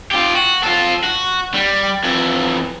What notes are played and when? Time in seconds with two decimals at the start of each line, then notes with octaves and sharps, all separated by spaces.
0.11 F4 G4
0.35 F#4
0.63 F4 A4
1.04 F#4
1.54 G3
2.03 F2 E3